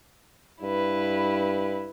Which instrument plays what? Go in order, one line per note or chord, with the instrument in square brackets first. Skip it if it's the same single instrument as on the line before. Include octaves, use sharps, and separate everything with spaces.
[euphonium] G2 [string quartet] E4 B4